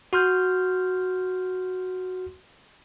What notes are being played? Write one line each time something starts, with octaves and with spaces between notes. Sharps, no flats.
F#4 C6 F6 G6